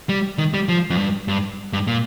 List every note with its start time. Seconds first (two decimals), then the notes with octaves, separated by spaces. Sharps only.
0.09 G3
0.38 D#3
0.54 G3
0.68 F3
0.90 F2
0.98 G2
1.28 G2
1.73 G2
1.87 A#2